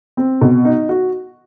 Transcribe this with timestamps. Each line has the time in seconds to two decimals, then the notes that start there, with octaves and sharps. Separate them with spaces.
0.17 C4
0.41 B2
0.65 D#4
0.89 F#4